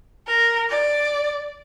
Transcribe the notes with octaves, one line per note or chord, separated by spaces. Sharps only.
A#4
D5